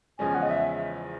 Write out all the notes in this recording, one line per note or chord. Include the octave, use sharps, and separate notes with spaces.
E2 C#3 F3 G#3 C#4 G#5
F#5
D#5
E5